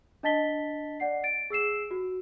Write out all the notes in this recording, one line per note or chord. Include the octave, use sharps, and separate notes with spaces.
D4 D#5 A5 A6 B6 G7
D5 F#5 C7
A6 D7
G#4 E6 C7 E7
F#4